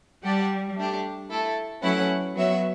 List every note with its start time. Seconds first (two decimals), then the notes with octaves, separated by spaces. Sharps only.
0.24 G3 G4 D5 F#5 A5
0.76 A3 D4 G4
1.29 A3 E4 A4
1.82 F#3 A3 C#4 E4 B4 F#5
2.35 F#3 B3 F#4 C#5 E5